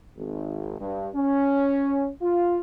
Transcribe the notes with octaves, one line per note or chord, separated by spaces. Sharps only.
G#1
G2
C#4
F4